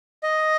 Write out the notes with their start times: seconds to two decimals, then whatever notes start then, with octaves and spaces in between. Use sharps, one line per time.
0.23 D#5